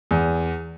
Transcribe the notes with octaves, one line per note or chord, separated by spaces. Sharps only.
E2